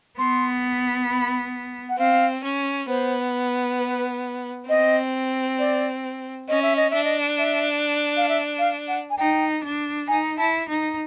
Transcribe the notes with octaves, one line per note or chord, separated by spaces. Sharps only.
B3 C6
B5
F#5
C4 F5
C#4
B3 C5
B4
C4 D#5
D5
C#4 D#5
E5
D#5
D4 E5
D#5
E5
F5
E5
F5
F#5
G#5
D#4 G5
D4
D#4 G#5
E4 A5
D#4